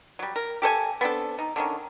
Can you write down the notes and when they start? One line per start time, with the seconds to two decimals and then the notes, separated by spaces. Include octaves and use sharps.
0.19 F#3 G3
0.36 A#4
0.62 G4 A4 C5 G#5
1.01 B3 C4 D4 A4
1.39 D#4
1.56 D3 D#3 C#4